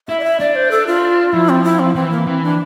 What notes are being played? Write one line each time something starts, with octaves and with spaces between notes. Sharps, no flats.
E4 E5
D5
E5
D4 D5
C5
A4
F4
F3 E4
C4
E4
C4
E3 C4
A#3
E3 C4
D4